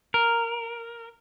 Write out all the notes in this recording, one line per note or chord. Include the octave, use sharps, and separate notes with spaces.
A#4